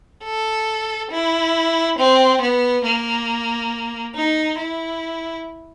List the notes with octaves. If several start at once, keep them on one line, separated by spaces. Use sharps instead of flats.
A4
E4
C4
B3
A#3
D#4
E4